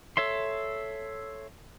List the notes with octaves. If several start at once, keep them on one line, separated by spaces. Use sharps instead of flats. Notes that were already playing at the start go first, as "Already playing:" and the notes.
A4 C#5 E5 C6